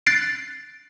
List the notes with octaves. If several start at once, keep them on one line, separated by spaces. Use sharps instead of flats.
F#6 A6 C7 D7